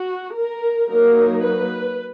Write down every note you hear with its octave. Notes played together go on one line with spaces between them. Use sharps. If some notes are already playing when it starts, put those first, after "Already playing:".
Already playing: F#4
A#4
F#3 A#3 D#4 A#4
B4